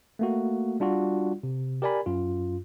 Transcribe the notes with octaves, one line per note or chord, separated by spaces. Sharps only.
A3 A#3 F#4
G3 D4 F4 F#4
C3
G4 A#4 D5 G#5 B5
F#2 F4